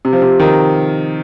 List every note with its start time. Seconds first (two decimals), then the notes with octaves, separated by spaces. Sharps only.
0.05 C3
0.13 F3
0.22 C3
0.40 D#3